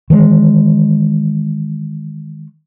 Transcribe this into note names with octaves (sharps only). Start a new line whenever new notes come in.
D#3 E3 G#3